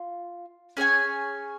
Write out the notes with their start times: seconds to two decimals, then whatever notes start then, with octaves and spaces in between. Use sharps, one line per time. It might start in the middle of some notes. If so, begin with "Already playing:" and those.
Already playing: F4
0.77 C#4 G#4 C#5 G#5